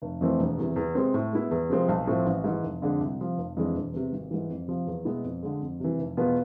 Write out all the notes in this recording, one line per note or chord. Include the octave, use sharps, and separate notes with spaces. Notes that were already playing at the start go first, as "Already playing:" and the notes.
F1
F2 E3 A3 C4
E1
E2 C3 E3
E2
C3 G#3 C4
A2
G#3 B3 E4
E2
C3 F3 G#3 C4
B1
A2 F3 A3 C4
A1
G#2 E3
F1
F2 D3 G#3 D4
C2
C3 F3
F1
F2 E3 G#3 D4
E1
E2 C3
G#1
G#2 E3
F2
C3 F3
E2
B2 G#3 B3 E4
F2
D3 G#3
F2
C3 E3
F1
E2 B2 B3 F4